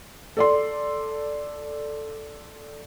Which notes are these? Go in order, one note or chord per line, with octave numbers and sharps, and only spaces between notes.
A4 D5 C6